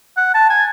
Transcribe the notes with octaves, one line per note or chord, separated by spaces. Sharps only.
F#5
A5
G#5